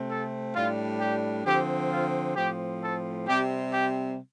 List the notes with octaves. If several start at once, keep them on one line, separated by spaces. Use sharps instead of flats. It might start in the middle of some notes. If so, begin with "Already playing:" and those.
Already playing: C3 A3 C4
A4
A2 G3 D4 F4
G4
D3 F3 C4 G4
F4
A2 F3 C4 G4
A4
C3 G3 C4 G4
G4